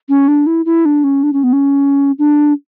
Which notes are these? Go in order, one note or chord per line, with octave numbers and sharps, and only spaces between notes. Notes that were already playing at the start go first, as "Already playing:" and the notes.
C#4
D4
E4
E4
D4
C#4
D4
C#4
B3
C#4
D4